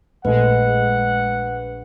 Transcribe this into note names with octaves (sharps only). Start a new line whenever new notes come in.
A#1 G#3 A3 B4 F#5